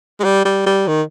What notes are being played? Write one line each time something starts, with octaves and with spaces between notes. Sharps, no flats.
G#3
G3
G3
G3
D#3